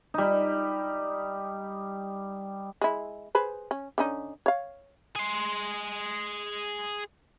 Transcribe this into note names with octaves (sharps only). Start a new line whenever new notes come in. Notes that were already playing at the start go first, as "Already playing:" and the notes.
G3 D#4
G#3 E4
G#4 B4 C5
C#4
D3 C#4 D#4
C#5 F5
G#4 C6